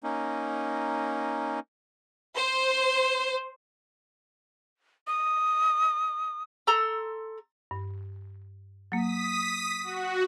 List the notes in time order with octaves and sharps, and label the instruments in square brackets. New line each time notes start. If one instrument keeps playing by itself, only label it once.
[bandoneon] A#3 C#4 D#4
[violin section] C5
[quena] D#6
[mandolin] A4 A#5 C6 E6
[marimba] G2
[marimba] F#3 A#3 [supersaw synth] D#6 B6
[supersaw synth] F#4